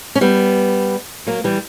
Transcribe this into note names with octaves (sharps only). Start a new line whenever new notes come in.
C#4
G3 B3
F#3 A#3
E3 G3